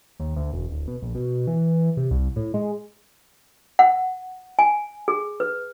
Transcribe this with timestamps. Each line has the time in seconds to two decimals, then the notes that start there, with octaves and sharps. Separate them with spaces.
0.20 D#2
0.36 D2
0.53 E1
0.70 D1
0.88 B2
1.02 A#1
1.15 B2
1.47 E3
1.97 C3
2.11 C2
2.36 A2
2.54 G#3
3.79 F#5
4.59 G#5
5.08 G#4
5.40 B4